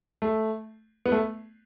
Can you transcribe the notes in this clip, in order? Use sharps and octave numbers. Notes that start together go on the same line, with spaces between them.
A3
B3
A3